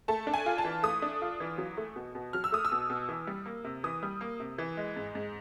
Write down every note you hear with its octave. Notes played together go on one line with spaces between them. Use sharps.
A3 A5
D4
G#5
F4
A5
E3
A3 D#6
D4
F4
E3
F#3
A3
B2
B2
F#3 F6
E6
A3 D#6
E6
B2
B2
E3
G3
A#3
C3
E3 D#6
G3
A#3
C3
E3
G#3
G#2
G#2